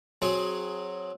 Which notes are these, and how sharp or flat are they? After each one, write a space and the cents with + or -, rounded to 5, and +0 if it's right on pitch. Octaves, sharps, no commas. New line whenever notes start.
F#3 -5 C4 +15 G#4 +15